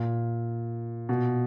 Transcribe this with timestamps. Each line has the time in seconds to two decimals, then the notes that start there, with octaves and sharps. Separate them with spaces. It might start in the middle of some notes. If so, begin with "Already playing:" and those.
Already playing: A#2
1.09 B2